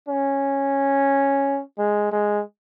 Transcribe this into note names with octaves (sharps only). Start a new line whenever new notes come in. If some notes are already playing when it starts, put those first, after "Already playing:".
C#4
G#3
G#3